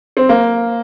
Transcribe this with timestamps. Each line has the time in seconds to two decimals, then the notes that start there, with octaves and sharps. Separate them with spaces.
0.17 C4
0.29 A#3